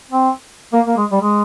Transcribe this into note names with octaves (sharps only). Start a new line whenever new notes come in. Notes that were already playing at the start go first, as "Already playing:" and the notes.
C4
A#3
A#3
G#3
G3
G#3